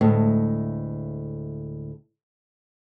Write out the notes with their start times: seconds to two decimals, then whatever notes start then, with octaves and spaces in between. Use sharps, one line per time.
0.01 D2 A2 G#3